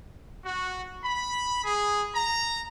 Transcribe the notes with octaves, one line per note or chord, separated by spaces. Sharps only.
F#4
B5
G#4
A#5